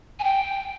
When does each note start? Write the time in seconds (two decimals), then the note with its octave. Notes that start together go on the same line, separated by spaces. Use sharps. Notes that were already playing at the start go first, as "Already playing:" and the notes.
0.19 G#5
0.24 G5